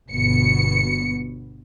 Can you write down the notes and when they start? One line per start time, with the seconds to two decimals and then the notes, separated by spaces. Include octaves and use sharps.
0.11 G1 B2 C#7